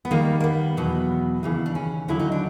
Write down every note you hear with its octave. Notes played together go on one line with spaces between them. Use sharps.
B3
D#2 D#3 G3 A#3
A#3
B3
E2 B2 F#3
D#2 C#3 E3
D4
C#4
D#2 D3 F#3 E4
D#4
D4